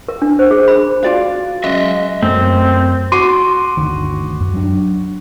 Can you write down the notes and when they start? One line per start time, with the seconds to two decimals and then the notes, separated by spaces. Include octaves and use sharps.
0.08 A#4
0.22 D4
0.39 C5
0.51 G#4
0.68 B5
1.03 F4 F#4 D5 F5
1.64 F#3 G#3 C#4 B4 D#5 E5
2.23 F#2 A3 C4
3.12 F#4 C6 D6 D#7
3.77 G1 D2 D#3
4.40 F#2
4.54 F#3 D4